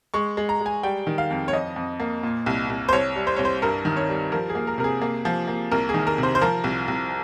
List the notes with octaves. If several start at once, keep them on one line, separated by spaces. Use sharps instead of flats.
G#3 C#6
G#3
A#5
G#3
G#5
G3 G5
D#3
F5
F2
C#5
F2 D#5
F2
A#3
A#2
C2
C2
C5
C2 C#5
G3
C5
C2 C#5
C5
G2 A#4
D#3
C#5
G3
F3 A#4
G#4
A#3
A#4
C3 A#4
G#4
A#3
F3
A#3
C2 A#4
G#4
D#3
A#4
C3
C5
C5
F3 A#4
C2
C2